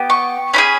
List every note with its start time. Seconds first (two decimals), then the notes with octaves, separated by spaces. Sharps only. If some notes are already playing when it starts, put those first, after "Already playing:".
Already playing: B3 G4
0.10 C#6
0.54 C#4 E4 G#4 B5